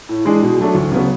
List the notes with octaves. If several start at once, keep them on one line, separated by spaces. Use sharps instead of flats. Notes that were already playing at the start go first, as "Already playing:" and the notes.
A2
E3 G#3 D4 G#4
B2
F#3 A3 D4
D2
C#3 F#3 B3